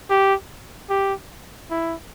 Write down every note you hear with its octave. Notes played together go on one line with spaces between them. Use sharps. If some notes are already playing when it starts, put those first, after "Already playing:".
G4
G4
E4